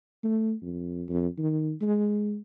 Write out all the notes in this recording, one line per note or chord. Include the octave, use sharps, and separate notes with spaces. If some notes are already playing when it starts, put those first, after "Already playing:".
A3
F2
F2
D#3
G#3